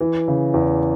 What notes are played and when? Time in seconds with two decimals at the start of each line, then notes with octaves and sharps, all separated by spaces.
0.01 E3
0.28 C#3
0.54 E2